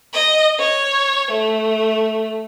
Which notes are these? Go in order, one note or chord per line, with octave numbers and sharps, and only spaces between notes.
D#5
C#5
A3